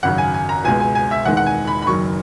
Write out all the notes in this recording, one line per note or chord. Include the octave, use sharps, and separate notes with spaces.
G#1 F#2 C#3 F#3 F#5
G#5
G#5
A#5
C#2 B2 G#3 G#5
G#5
G#5
E5
E1 E2 D#3 G#3 F#5
F#5
G#5
B5
B5
F#1 F#2 D#3 F#3 C#6